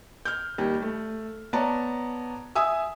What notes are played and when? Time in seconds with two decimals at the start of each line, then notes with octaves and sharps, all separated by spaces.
0.25 F6 G6
0.58 D#2 G3
0.82 A3
1.53 B3 C#5 D5 A5 A#5
2.56 E5 G#5 D#6 E6